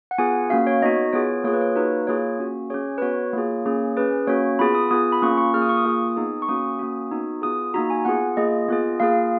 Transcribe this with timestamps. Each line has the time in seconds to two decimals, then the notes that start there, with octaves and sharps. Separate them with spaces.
0.11 F#5
0.18 B3 F4 G#4 G#5
0.50 A#3 C#4 F#4 F5
0.67 C#5
0.82 B3 D#4 F#4 D#5
1.13 B3 F4 G#4 C#5
1.44 A#3 F4 G#4 C#5
1.53 B4
1.61 C#5
1.76 A#3 D#4 F#4 B4
2.07 A#3 F4 G#4 C#5
2.39 A#3 C#4 F#4
2.70 C#4 G#4 C#5
2.98 B4
3.02 B3 F#4 C#5
3.33 A#3 F4 G#4
3.65 A#3 C#4 G#4
3.97 C#4 G#4 B4
4.27 A#3 C#4 F#4 C#5
4.59 B3 F4 G#4 B5
4.75 D#6
4.90 B3 F4 G#4 D#6
5.12 B5
5.22 A#3 C#4 F4 C#6
5.37 C#6
5.54 A#3 F4 G#4 F6
5.62 D#6
5.69 C#6
5.77 D#6
5.86 A#3 F4 G#4
6.17 B3 D#4 G#4
6.42 C#6
6.49 A#3 C#4 F#4 D#6
6.79 A#3 C#4 F#4
7.11 B3 D#4 F#4
7.42 B3 F4 G#4 D#6
7.74 A#3 D#4 F#4 A#5
7.90 G#5
8.05 B3 F4 G#4 F#5
8.37 A#3 F4 G#4 D#5
8.68 B3 F4 G#4
9.00 A#3 F4 G#4 F5